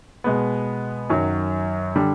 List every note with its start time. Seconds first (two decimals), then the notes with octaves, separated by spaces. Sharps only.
0.24 B2 G#3 B3
1.10 F#2 D#3 F#3
1.96 D3 G3